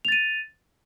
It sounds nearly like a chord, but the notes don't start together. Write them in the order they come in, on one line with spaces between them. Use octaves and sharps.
F7 A6 D#7